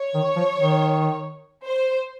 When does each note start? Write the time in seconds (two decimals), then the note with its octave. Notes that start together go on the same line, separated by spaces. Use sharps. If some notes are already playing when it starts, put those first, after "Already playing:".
Already playing: C#5
0.14 D#3
0.36 F3
0.57 D#3
1.65 C5